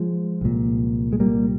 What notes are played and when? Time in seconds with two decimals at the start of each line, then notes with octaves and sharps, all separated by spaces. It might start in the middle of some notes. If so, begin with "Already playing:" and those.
Already playing: F3 G#3
0.41 C2 A#2
1.13 G#3
1.20 G3 A#3